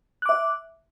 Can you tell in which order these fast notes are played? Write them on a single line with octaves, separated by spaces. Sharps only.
F#6 D6 E5